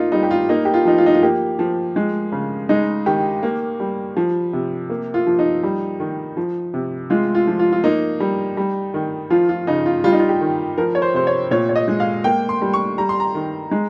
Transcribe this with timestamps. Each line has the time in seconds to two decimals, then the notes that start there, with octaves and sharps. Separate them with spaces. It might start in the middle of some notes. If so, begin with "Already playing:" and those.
Already playing: A#3 D#4 F4
0.12 G3 D#4
0.23 G4
0.31 F4
0.49 A#3 D#4
0.65 G4
0.74 F4
0.85 F3 D#4
0.98 F4
1.06 D#4
1.14 F4
1.22 A#3 G4
1.59 F3
1.96 G#3
2.32 C#3
2.69 G#3 D#4
3.06 D#3 G4
3.43 A#3
3.80 G3
4.17 F3
4.53 C3
4.90 A#3
5.14 F4
5.27 F3
5.39 D#4
5.63 G3
6.00 D#3
6.37 F3
6.74 C3
7.10 G#3 F4
7.35 F4
7.47 F3
7.59 F4
7.72 F4
7.84 A#3 D#4
8.20 G3
8.57 G3
8.94 D#3
9.30 F3 F4
9.49 F4
9.67 C#3 D#4
9.86 F4
10.04 G3 F4
10.13 D#4
10.20 F4
10.29 G4
10.41 D#3
10.78 F3 A#4
10.95 C#5
11.02 C5
11.14 C3 C5
11.27 C#5
11.51 A#2 C#5
11.69 C#5
11.76 D#5
11.88 G#3
12.00 F5
12.24 A#3 G5
12.49 C6
12.62 G3
12.74 C#6
12.98 G3 A#5
13.09 C6
13.20 A#5
13.35 D#3
13.71 G#3